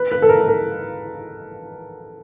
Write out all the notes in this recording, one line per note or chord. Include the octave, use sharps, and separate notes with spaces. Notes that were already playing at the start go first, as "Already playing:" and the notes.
Already playing: B4
B4
A4
A#4
A#4